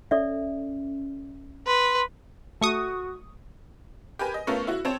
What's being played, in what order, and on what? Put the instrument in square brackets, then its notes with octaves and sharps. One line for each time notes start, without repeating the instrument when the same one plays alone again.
[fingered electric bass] C#4 [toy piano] A4 D5 E5
[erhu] B4 [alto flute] C6
[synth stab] A3 C#6 D#6 [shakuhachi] F#4
[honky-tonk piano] G4 A#4 B4 G#5
D#5
A3 B3 C#4 F4 A4 A#4
E4 F#4
C4 C#5 A5